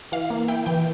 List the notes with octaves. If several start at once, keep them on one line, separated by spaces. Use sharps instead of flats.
E3 F5
A#3
E4 G5
E3 G5